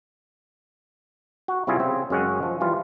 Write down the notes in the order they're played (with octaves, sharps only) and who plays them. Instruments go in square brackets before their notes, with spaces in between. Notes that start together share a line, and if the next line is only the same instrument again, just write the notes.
[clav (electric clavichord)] F#4
C3 G3 E4 F4 G#4
C#3 C4
F#2 C#3 G#3 C#4 G#4 F#5
F3
E3 G3 F4